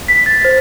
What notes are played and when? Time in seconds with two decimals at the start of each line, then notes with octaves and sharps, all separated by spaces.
0.08 B6
0.26 A6
0.45 C5